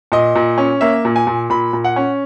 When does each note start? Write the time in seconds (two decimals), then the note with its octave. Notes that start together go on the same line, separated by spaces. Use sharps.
0.12 A#2 D#5
0.35 A#2
0.58 C#4
0.81 A#3 E5
1.05 A#2
1.16 G#5
1.27 A#2
1.50 A#2 B5
1.73 A#2
1.85 F#5
1.96 C#4